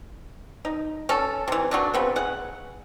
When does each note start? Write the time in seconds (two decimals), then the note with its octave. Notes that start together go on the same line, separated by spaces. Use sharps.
0.65 D#4
1.09 C#4 A4
1.48 C3 E3
1.71 F#3 A3 D4
1.94 C#3 B3 C4
2.16 G#4 F#5